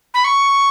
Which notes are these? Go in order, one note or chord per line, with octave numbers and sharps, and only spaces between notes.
B5
C#6